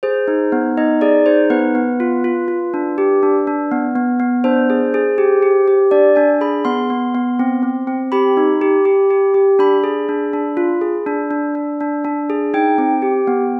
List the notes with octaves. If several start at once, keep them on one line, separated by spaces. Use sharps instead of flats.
G#4 C5
D#4
B3
D#4 D#5
G#4 D5
D#4 C5
B3 B4
B3
F4
F4
F4
D4
G4
D4
D4
B3
B3
B3
D4 C5
G#4
G#4
G4
G4
G4
D4 D5
D4 G#5
G#4 B5
B3 C6
B3
B3
C4
C4
C4
G4 B5
D#4
G4
G4
G4
G4
D4 B5
G#4
D4
D4
F4
G#4
D4
D4
D4
D4
D4
G#4
D#4 G5
C4
G4
B3